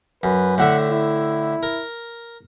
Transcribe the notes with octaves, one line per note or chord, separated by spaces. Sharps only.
F#2 B4
A2 D3 E5 F#5
E4
A#4